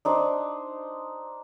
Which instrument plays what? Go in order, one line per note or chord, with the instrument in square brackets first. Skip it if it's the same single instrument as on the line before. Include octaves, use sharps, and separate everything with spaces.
[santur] D4 D#4 C5